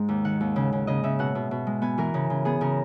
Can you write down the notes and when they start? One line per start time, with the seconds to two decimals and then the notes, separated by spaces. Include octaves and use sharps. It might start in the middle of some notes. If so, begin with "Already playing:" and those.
Already playing: G#2 G#3
0.08 D#2
0.25 D#3 F#5
0.41 D#2
0.56 C#3
0.73 C#3
0.87 C#3 D#5
1.04 C#3 E5
1.19 B2 F#5
1.35 B2
1.51 B2
1.67 G#3
1.82 B3 G#5
1.98 E3 A#4
2.14 C#3
2.30 C#3
2.45 B3 G#4
2.61 C#3 A#4